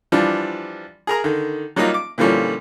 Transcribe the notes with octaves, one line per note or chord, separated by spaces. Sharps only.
E3 F3 G3 D4
G#4 A#4 A#5
D3 D#3
F#3 G3 A#3 D#4 F4
D6
A#2 D3 E3 F3 G3 C#4